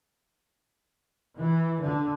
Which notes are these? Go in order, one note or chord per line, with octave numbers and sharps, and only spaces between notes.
E3
D3